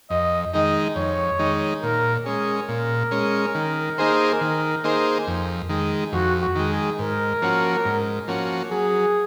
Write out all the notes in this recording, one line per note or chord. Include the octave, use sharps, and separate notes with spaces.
F2 D#5
D#3 G#3 D#4 D#5
F2 C#5
D#3 G#3 D#4
A#2 A#4
G#3 C#4 G#4
A#2 A#4
G#3 C#4
D#3
A#3 D#4 G#4 C5
D#3
A#3 D#4 G#4 C5
F2
D#3 G#3
F2 F#4
F#4
D#3 G#3
G#4
G#2 A#4
F3 A#3 C#4 F#4
G#2
F3 A#3 C#4 F#4
F#3 G#4